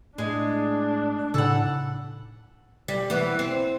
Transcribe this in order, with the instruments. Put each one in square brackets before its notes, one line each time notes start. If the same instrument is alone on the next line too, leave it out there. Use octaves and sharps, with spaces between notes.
[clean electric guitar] A2 [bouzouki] G#3 [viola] D4
[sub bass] A2 [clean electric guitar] C#3 D#4 B5 [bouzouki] A4 F#5
[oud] G3
E3 B3
C4